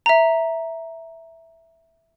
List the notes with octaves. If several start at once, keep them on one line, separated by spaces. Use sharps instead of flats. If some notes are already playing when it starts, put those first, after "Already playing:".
E5 A#5